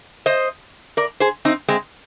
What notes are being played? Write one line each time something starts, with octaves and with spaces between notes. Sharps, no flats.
C5 D#5
A#4 D5
G#4 C5
C4 D#4
G#3 C4